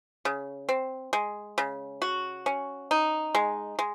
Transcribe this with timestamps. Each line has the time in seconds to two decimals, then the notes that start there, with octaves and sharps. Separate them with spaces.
0.25 C#3
0.69 C4
1.13 G#3
1.58 C#3
2.02 F#4
2.46 C#4
2.91 D#4
3.35 G#3
3.79 G#3